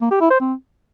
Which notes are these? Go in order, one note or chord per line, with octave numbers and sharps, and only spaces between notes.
A#3
G4
E4
C5
C4